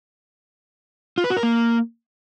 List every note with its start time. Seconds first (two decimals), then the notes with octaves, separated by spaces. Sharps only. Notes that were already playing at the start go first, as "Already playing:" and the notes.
1.18 F4
1.24 B4
1.30 F#4
1.37 A#4
1.43 A#3